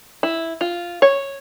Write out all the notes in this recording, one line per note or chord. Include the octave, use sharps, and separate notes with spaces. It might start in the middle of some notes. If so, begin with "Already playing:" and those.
E4
F4
C#5